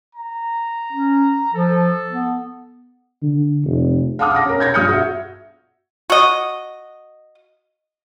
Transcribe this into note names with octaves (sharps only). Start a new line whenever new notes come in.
A#5
C#4
F3 A4
B3
D3
F1
F5 F#5 A5 D6 D#6 F6
F5 F#5 D6 A#6
C#4 A#4
C#5 G6 G#6 A#6
G2 F4 D#6 F6 G6 C#7
F#4 E5
F#4 D#5